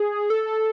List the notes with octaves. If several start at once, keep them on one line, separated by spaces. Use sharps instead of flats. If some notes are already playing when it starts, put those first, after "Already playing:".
Already playing: G#4
A4